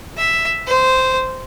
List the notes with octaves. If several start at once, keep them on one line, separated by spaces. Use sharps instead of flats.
E5
C5